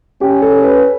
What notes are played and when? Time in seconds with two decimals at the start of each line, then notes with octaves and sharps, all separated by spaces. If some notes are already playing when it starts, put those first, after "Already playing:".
0.21 C#4 G4
0.42 A4
0.64 B4